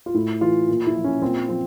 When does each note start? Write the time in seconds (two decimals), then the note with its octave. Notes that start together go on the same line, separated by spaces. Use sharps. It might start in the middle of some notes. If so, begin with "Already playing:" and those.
0.06 F4
0.14 A2 E4
0.41 E3 F4
0.68 A#2
0.87 E4
0.95 F3
1.04 C#4
1.22 A#2 C4
1.48 F3 C4